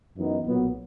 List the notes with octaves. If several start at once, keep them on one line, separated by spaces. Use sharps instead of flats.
F#2 E3 B3 D#4
B1 A#2 F#3 B3